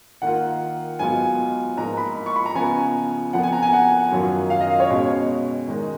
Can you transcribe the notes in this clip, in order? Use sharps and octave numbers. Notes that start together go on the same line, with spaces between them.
D#3 A#3 F4 F#5
G#2 F#3 B3 F4 G#5
G#2 F3 A#3 A#5
B5
C#6
B5
A#5
C#3 F3 B3 F4 G#5
F2 F3 B3 F#5
G#5
A#5
G#5
F#5
F#2 D#3 F#3 C#4 F4
F5
D#5
F5
C#5
B2 G#3 C#4
D#3 G#3 D#4